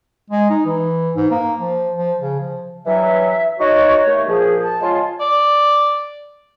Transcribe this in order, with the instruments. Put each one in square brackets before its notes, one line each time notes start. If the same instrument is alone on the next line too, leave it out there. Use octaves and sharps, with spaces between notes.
[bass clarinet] G#3
D#4
E3
G#2
A#3
F3
F3
C#3
F3
[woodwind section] G2 E3 F#3 [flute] E5
[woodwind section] D#4 F#4 [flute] C#5
[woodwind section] D#2 A3
[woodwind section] A#2 F3 [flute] G#4
[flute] A5
[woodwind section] C#3 G#3 F4
[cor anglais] D5